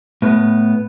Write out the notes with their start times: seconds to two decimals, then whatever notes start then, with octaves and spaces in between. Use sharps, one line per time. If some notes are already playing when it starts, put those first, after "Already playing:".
0.22 A2 B3